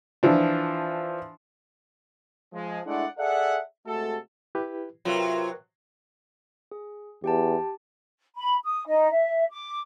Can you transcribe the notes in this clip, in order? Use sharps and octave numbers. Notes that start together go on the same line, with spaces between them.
E3 F3 D4
F3 G#3
G#3 A3 D4 E4 D5 F#5
G#4 A4 D5 E5 F#5
C3 G#3 A3 F#4 A4
E4 G4 B4
C3 F#3 F4 A#4 B4 G5
G#4
E2 G4 G5 A5
B5
D#6
D#4 D#5
E5
D6